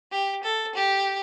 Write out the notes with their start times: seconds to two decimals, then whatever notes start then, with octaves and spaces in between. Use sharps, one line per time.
0.11 G4
0.43 A4
0.75 G4